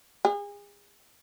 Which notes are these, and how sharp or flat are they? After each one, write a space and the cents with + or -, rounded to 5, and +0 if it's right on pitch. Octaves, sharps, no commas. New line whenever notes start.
G#4 -35